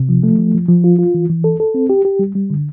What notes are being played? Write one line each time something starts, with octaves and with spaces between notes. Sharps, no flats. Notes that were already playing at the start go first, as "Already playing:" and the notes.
Already playing: C3
F3
A3
F3
F3
F3
F4
F4
E3
E3
A4
A4
C4
G4
G4
G3
G3
D3